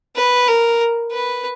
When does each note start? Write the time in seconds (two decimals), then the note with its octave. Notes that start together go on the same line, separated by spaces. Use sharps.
0.16 B4
0.48 A#4
1.12 B4